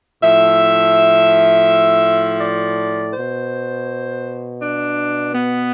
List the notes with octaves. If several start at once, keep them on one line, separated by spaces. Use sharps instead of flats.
A2 F3 E5
D5
B2 C5
D4
B3